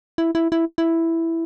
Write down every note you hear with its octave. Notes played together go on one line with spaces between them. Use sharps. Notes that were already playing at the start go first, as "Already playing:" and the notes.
E4
E4
E4
E4